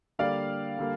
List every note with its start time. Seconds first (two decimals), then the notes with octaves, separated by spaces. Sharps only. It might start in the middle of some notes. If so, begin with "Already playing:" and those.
0.19 D3 G3 A#3 D5 F5
0.79 D3 G3 A#3